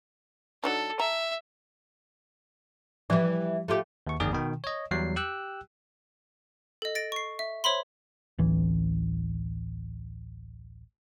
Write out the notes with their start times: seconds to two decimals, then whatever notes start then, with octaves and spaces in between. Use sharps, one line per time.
0.64 F#3 D4 D#4 A4
1.00 E5 A#5
3.10 E3 F3 G3
3.68 A3 F4 G4
4.07 D#2 C#6
4.20 G1 F2 D#3 A#3 G#4 D5
4.33 B2 D#3 G5
4.64 C#5 D#5
4.91 E2 F#3 G3 C7
5.16 G4 G5 E6 F#6
6.82 A4 D#5
6.95 A6 A#6 D7
7.12 C#6 C7
7.39 E5
7.64 C5 C#5 E5 B5 C6
8.38 D1 A1 E3